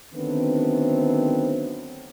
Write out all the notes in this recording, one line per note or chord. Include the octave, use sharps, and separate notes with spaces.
D3 D#3 F#3 A3 B3 C4